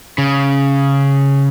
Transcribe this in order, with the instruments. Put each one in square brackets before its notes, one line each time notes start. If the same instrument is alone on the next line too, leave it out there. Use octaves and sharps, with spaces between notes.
[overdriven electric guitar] C#3